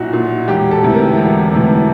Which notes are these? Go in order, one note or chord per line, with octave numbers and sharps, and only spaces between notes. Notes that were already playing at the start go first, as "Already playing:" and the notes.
Already playing: B1 A#2 E4 F#4
A#2
E1 G4
A4
D2 C3 E3
A#4
E1
D2 C3 E3